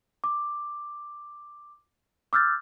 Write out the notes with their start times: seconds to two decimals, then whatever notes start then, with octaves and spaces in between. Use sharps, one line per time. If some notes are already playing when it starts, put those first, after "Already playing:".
0.24 D6
2.33 D6 E6 F6 G6 A6